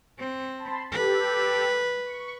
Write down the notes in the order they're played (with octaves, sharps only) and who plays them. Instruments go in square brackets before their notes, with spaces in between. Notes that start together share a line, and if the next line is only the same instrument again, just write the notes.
[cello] C4
[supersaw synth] A5 B5 C6
[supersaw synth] G4 A4 [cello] B4
[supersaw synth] C#6